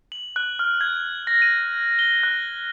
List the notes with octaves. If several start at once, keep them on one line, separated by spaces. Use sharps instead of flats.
F#7
F#6
F6
G#6
A#6
D#7
G7
F#6